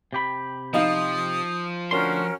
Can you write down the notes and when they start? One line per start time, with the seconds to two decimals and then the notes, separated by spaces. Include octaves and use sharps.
0.13 C3 G4 B5
0.73 F3 D#4 D#5 F5 D#6
1.91 D2 C#4 D4 F#4 A#4 C6